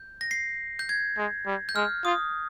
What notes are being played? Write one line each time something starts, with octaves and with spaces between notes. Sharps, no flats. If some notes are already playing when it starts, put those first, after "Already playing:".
Already playing: G6
A#6
C7
G6
G#6
G#3
G3
G6
G#3 F6
F4 D#6